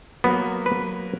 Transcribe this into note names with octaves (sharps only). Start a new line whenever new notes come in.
F#3 A#3 B3
B4